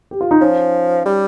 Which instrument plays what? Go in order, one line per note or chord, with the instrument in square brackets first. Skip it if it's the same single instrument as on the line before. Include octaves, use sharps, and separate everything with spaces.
[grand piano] G4
F4
D#4
[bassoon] F3 [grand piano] C#4
[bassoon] G3